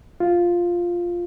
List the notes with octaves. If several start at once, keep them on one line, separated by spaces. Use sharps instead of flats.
F4